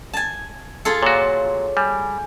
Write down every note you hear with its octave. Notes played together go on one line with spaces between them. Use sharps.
G#5 A5
F4 G#4 A4
A#2 F#4 C#5
G3 G#5